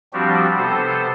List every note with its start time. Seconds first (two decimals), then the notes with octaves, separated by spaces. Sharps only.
0.13 F3 G3 C4 D4 F#4 G4
0.58 C3 B3 A4 C5